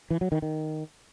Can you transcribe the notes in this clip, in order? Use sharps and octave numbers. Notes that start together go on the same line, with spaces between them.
E3
F#3
D#3
D#3